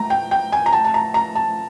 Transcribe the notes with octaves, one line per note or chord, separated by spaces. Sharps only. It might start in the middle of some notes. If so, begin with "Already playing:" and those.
Already playing: A3 A#5
G5
G5
G#5
A#5
A3 A5
A5
A#5
A#5
A5